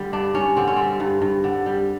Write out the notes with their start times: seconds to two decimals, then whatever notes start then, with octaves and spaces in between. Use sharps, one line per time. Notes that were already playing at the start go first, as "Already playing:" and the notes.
Already playing: D3 G3
0.13 G2 D4
0.35 G2 C#4
0.57 D3 C4
0.67 C#4
0.76 G3 C4
1.00 G2
1.22 G2
1.44 D3
1.66 G3